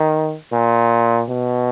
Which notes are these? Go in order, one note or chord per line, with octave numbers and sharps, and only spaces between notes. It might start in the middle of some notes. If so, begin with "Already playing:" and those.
Already playing: D#3
A#2
B2